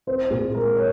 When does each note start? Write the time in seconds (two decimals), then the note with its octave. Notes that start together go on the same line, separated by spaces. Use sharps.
0.07 C4 C5
0.30 A#2 G#4
0.54 G#3 A#4
0.77 C#5